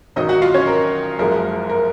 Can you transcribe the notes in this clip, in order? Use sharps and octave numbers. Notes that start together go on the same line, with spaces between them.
G#1 F#2 D#3 F#3 D#4 D#5
F#4 F#5
F4 F5
C#4 C#5
A#4
F#1 F#2 F3 G#3 A#4
A#4